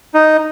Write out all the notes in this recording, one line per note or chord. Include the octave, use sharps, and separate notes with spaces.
D#4